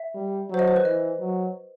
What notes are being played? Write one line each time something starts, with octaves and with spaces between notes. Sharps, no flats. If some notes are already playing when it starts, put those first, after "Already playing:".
Already playing: E5
G3
F#3 C5
D#5
C5
B4
E3 D#5
F#3